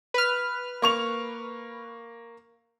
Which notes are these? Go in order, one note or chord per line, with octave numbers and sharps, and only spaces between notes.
B4 F6
A#3 C#6 F7